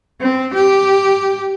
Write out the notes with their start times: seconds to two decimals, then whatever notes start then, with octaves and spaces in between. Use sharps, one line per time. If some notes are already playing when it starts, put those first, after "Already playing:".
0.20 C4
0.54 G4